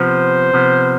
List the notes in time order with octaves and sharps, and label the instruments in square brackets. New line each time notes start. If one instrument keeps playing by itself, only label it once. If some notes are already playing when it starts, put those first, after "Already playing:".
Already playing: [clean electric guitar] C3 F3 B3 [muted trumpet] C5
[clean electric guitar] C3 F3 B3